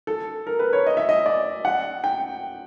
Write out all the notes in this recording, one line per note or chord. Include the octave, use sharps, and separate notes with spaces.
A4
A#4
B4
C#5
D#5
E5
D#5
D5
F#5
G5